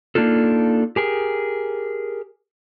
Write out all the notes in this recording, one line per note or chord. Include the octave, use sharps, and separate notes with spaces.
A#3 D4 D#4 F4 A4
G4 G#4 A#4